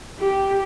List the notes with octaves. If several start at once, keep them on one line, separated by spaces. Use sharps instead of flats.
G4